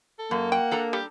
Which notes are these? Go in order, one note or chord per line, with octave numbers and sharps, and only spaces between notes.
A4
F#2 A#3
F#5 G5
D4 A4 A#5
G3 G4